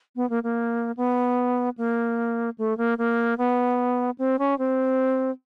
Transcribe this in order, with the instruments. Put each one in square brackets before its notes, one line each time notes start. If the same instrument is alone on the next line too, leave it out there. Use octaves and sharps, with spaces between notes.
[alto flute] B3
A#3
A#3
B3
A#3
A3
A#3
A#3
B3
C4
C#4
C4